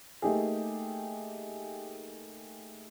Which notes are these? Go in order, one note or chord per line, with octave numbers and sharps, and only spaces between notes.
A3 A#3 D#4 G4 G#4